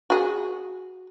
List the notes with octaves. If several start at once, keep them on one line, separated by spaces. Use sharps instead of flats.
F#4 G#4